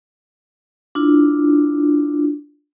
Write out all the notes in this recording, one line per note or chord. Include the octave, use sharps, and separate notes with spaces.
D4 E4 F4